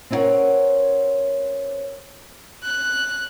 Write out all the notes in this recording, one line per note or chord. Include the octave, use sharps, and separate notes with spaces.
C4 C#4 E4 A#4 C#5 F#5
F#6